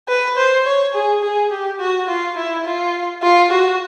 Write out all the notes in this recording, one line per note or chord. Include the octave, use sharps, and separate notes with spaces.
B4
C5
C#5
G#4
G#4
G4
F#4
F4
E4
F4
F4
F#4